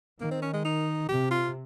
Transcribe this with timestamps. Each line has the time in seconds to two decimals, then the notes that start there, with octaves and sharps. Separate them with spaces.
0.21 D#3 A#3
0.31 C4
0.42 C#4
0.54 G#3
0.65 D#4
1.09 C3 G4
1.31 F4